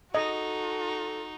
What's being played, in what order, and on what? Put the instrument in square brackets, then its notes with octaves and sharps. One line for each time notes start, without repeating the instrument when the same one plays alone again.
[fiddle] D#4 [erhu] F#4 [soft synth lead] A4 [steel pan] D#5